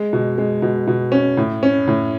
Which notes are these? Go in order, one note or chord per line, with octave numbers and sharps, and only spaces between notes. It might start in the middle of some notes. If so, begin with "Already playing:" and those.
Already playing: G#3
B2
G#3
B2
B2
C#4
A2
C#4
A2